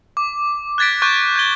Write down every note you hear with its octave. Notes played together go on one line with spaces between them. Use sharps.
D6
F#6 G#6 A6 B6 D7
C#6 D6 F#6 G6
G6 G#6 G7